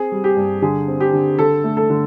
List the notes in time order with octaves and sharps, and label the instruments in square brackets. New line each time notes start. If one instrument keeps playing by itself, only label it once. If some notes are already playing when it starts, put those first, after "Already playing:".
Already playing: [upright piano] C4 G#4
G3
G4
G2
D3 G#4
C4
G4
D3
D3 A4
A3
A4
D3